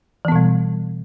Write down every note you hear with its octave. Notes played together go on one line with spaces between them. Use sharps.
B2 E3 G3 B3